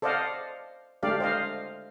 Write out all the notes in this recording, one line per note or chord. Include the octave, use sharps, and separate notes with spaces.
A4 C5 D5 D#5 F5 F#5
G#3 A3 D4 G4 D5 F5
C5 D#5 F5